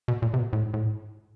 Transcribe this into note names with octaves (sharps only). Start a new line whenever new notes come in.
B2
A#2
C3
B2
A2
G#2
A2